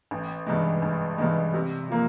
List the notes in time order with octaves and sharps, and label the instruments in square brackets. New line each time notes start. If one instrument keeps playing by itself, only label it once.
[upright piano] A1
G2 E3 G#3
A1
G2 E3 G#3
C3
F3 A#3